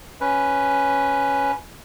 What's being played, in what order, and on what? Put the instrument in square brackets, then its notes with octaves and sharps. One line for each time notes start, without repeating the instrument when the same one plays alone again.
[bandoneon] C#4 B4